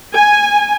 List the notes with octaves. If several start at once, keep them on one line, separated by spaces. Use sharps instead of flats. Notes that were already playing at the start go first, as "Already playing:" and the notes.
G#5